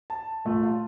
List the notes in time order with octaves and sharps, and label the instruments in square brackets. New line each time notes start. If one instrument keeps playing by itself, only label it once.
[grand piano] A5
A#2 A3 F4
F4 A5